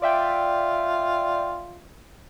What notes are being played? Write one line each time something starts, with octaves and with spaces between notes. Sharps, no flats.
F4 D5 E5 G5